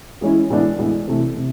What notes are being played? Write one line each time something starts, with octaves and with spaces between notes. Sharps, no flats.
E3 G#3 C#4 E4
A2 E3 G#3 B3 D4
A2 E3 G#3 B3 D4
C3 E3 A3
C3